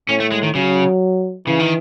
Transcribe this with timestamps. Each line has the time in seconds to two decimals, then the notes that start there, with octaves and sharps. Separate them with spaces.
0.09 A2 C#4
0.20 A3
0.32 G#3
0.43 D#3
0.54 C#3 F#3
1.47 C#3 E3
1.59 D#3